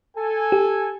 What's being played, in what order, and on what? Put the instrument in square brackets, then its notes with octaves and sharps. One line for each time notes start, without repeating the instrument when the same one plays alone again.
[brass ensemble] A4 G#5
[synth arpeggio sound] G4